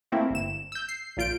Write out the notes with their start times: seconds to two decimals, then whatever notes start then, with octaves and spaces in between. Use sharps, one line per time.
0.12 A3 A#3 C4 E4
0.30 G1 E7
0.72 E6 G6
0.89 C7
1.17 A#1 A#2 F4 G6 D7